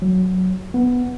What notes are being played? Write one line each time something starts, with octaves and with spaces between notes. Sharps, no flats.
F#3
B3